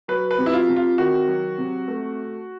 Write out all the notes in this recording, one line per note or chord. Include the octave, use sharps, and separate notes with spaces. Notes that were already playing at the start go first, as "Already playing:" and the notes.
F#3 B4
B4
C3
E4
F4
C3
F4
D#3 F#4
F#3
C3
A3